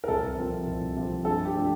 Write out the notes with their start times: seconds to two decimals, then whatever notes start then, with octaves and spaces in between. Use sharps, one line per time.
0.04 A#4
0.08 C2 A4
0.37 C3 F3 C4
0.67 C2
0.96 C3 F3 C4
1.25 G2 A4
1.45 G4
1.55 F3 A3 D4